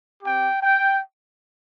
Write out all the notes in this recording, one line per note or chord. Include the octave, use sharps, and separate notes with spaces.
C4 G4 G5
G5